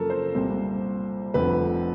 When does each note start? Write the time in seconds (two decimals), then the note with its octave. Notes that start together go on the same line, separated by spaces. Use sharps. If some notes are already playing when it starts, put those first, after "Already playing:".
Already playing: F#2 C#3 F3 A#3 A4 A#4
0.10 C5
0.35 C2 A#2 G3 C5
1.34 F1 F2 D3 F3 B4